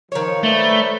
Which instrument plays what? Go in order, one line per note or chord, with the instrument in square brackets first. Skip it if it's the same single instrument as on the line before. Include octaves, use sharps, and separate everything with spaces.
[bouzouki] D#3 C#5 [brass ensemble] F3
[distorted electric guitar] A3 [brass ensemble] B4 C5 D5 [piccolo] G7